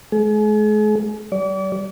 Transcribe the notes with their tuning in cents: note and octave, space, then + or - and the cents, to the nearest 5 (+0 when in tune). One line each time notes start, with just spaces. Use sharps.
G#3 +40 G#4 +40
G3 -40 D5 -35